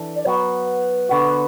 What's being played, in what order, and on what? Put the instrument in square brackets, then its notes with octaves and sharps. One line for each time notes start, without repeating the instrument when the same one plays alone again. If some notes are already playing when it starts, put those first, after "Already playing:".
Already playing: [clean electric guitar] E3 D4 A4
[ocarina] D5
[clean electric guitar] F#3 B3 F#4 [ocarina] B4
[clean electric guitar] D3 B3 F#4